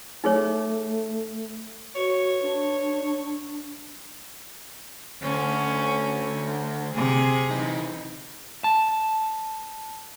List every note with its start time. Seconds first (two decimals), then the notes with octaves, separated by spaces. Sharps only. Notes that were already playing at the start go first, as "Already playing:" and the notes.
0.24 A3 D#4 G#4 C#5
1.96 F#4 C#5
2.42 D4
5.22 D2 C#4
6.95 C3 G#4
7.51 E3 D#4
8.64 A5